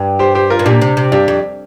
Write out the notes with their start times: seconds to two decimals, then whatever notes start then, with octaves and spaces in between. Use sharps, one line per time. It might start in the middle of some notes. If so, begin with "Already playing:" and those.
Already playing: G2
0.19 G4 C5
0.35 G4 C5
0.50 F4 A#4
0.59 G2
0.65 A#2 D4 G4
0.82 C3
0.97 C3
1.12 G2 D4 G4
1.28 F2